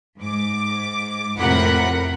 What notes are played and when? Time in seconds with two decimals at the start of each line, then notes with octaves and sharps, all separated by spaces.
0.18 G#2 D6
1.38 F2 A2 C3 A#4 F#5 B5